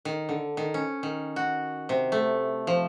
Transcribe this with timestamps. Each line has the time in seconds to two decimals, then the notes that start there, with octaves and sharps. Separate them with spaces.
0.05 D#3
0.29 D3
0.57 D#3
0.74 C#4
1.03 D#3
1.36 F#4
1.89 C3
2.12 A3
2.67 F3